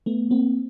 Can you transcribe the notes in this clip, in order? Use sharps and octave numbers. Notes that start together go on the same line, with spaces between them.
A3 B3
A#3 C4